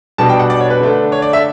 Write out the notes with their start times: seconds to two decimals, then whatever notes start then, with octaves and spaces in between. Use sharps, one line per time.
0.18 B2 G3 D4 A5
0.29 G5
0.39 F#5
0.50 D5
0.60 C#5
0.70 B4
0.81 D3 A3 D4
1.12 C#5
1.22 D5
1.33 E5